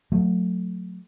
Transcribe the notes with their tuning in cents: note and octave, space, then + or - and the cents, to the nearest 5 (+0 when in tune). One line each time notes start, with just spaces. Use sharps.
F#3 -20 A3 +10